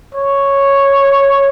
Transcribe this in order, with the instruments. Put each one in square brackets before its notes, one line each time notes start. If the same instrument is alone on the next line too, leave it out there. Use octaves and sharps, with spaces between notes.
[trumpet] C#5